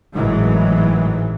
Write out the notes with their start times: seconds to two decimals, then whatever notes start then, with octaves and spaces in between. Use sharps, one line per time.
0.14 G#1 A2 D#3 E3 F#3 G#3